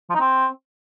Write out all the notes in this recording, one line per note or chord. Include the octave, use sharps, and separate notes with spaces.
F3
D#4
C4